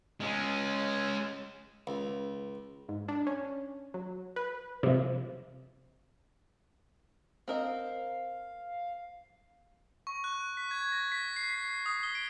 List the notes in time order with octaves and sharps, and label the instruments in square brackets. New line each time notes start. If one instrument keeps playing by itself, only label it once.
[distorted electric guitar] G#3 C#4
[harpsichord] C#2
[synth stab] G#2
D4
C#4
F#3
B4
[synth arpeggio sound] C3 F3
[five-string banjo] C4 A#4 D#5 [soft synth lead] F5
[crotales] C#6
F#6
B6
G#6
A#6
B6
C7
B6
B6
D#6
G7
D7